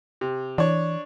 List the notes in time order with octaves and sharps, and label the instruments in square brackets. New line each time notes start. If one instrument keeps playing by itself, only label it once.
[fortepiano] C3
[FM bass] E3 [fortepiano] D4 C#5